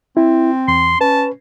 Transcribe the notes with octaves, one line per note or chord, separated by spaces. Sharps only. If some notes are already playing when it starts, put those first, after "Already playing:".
C4 E4
E2 C6
C#4 B4 A5